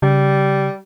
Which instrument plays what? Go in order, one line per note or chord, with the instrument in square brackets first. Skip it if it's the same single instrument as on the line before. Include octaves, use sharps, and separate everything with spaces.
[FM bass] C#3 [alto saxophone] G3